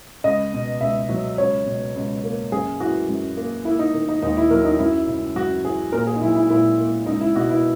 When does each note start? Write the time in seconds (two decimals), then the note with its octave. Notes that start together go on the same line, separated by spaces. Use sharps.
0.24 C#2 D#5
0.53 B2
0.81 C#2 E5
1.09 F#3
1.38 C#2 C#5
1.66 B2
1.96 C#2
2.23 A#3
2.52 F#2 G#4
2.80 E3 F#4
3.09 F#2
3.36 A#3
3.65 A#3 E4
3.79 D#4
3.94 D#3
4.08 D#4
4.22 D#2 D#4
4.37 E4
4.51 F#3 A#4
4.65 D#4
4.79 F#2 E4
5.08 C#3
5.36 F#2 F#4
5.64 E3 G#4
5.92 A#2 A#4
6.07 G#4
6.16 D#4
6.21 F#3 E4
6.35 E4
6.50 A#2 E4
6.79 A#3
7.06 C#2 D#4
7.21 E4
7.35 B2 F#4
7.49 E4